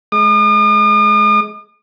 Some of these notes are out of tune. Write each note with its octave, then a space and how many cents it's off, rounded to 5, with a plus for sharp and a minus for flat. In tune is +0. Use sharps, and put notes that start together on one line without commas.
G#3 +30 D#6 -45